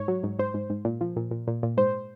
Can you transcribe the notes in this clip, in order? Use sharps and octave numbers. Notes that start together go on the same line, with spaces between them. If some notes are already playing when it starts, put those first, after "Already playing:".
Already playing: G#2 C#5
F#3
G#2
G#2 C5
G#2
G#2
A#2
F3
A#2
A#2
A#2
A#2
G#2 C5